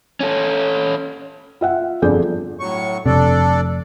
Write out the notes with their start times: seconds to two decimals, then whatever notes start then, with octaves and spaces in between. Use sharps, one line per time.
0.20 C#4 A4
1.61 F4 E5 F#5
2.02 G1 F2 G#4 A4 D5 G6
2.60 A2 F#3 C#6
3.06 F1 C3 D4 A4 D5